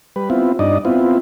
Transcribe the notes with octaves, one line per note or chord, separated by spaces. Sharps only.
G3 B4
B3 C4 E4 F4
G2 D4 D#4 D5 D#5
B3 C4 E4 F4